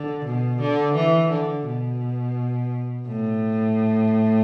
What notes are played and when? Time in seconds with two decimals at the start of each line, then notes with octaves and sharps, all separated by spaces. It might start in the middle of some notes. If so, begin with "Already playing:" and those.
Already playing: D3
0.25 B2
0.60 D3
0.95 E3
1.31 D3
1.65 B2
3.07 A2